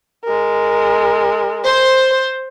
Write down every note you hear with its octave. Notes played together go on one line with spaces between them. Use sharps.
G#3 A#4
C5